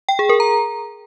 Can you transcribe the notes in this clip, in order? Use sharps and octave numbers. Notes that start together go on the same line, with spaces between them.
G5
G#4
A#4
A#5